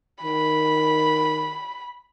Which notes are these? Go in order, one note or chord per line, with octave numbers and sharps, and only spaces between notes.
D#3 B5